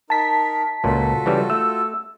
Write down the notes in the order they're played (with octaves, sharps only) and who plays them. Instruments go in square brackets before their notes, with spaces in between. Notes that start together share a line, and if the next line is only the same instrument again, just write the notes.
[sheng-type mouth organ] D#4 A#4 [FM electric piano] A5 B6
[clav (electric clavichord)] C#2 A#2 [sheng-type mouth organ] F4 F#4 A4
[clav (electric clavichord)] C#3 E3 G3
[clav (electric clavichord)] A3 [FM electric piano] E6